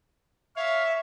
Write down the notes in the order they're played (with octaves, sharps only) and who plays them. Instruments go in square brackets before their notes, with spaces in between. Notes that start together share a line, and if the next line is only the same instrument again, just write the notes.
[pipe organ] C#5 F5 [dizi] E5